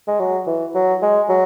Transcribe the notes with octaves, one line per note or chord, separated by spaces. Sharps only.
G#3
F#3
E3
F#3
G#3
F#3